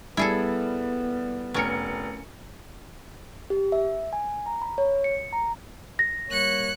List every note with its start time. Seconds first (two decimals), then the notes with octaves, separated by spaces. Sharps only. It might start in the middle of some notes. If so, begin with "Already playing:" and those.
0.17 G3 B3 E4 G#4 A4
1.54 F1 C#4 A#4 C#7
3.50 G4
3.72 E5
4.13 G#5
4.46 A#5
4.62 B5
4.78 C#5
5.04 C#7
5.33 A#5
5.99 A#6
6.30 G3 A#3 C#5 F#6 C#7